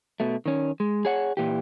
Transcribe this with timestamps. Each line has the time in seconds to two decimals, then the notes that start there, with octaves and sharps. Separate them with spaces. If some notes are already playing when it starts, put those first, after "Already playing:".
0.20 B2 A3
0.46 D#3 C#4
0.80 G#3
1.05 G#4 C#5 F#5
1.37 A#2 E3 G4